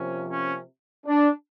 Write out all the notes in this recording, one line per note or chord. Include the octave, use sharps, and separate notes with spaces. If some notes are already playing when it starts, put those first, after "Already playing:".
Already playing: C3 F3 A#3 C#4
C#4
D4